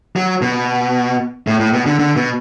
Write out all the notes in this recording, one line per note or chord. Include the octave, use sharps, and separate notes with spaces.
F#3
B2
A2
A2
B2
D3
D3
B2